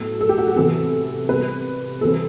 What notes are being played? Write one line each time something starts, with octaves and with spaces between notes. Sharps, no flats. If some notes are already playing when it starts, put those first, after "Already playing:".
Already playing: A2 F#3 B3 A4
A4
G4
F#4
G4
C3 E3 B3 A4
C3 G3 B3 B4
C3 E3 G3 C4 A4